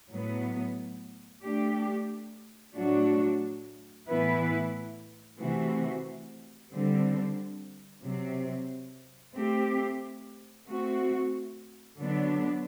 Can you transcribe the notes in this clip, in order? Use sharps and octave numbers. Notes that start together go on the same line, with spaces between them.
A2 F#3 B3
A3 D4 G4
A2 F#3 A3 D4 F#4
A2 E3 B3 E4 B4
C3 E3 A3 C4 F#4
D3 G3 C4
C3 F#3 C4
A3 C4 G4
A3 C4 F#4
D3 F#3 B3 D4